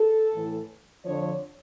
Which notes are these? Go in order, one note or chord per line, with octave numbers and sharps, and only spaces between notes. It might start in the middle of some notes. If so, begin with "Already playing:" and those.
Already playing: A4
A2 E3
F2 D3 F3 C#5